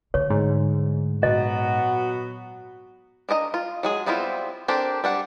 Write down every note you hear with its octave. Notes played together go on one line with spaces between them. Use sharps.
D3 A3 C#5
G#2
A#2 F#3 B3 F#4 D#5
D4 A#4 D#5 A#5
F4
F#3 G#3 G#4
G3 B3 C4 E4 F4
C4 D4 G4 A4 A#4
G3 D4 F#5